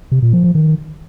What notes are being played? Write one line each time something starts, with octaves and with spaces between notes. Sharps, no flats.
C3
A#2
F3
F3
D#3